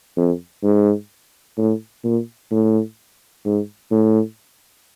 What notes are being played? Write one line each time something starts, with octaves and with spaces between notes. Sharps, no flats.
F2
G#2
A2
A#2
A2
G#2
A2